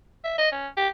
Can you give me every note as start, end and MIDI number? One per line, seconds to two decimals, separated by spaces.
0.25 0.38 76
0.38 0.50 75
0.52 0.67 61
0.77 0.88 67